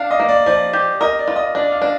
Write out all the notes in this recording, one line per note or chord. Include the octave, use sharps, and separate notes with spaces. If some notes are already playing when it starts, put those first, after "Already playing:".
Already playing: D4 F5
D#5
A#3
D5
F3 D5
G4
A#4 D#5
D5
F4
D#5
D4 D5
F5
D4